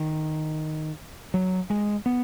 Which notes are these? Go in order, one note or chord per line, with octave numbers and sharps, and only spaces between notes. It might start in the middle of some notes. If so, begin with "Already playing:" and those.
Already playing: D#3
F#3
G#3
B3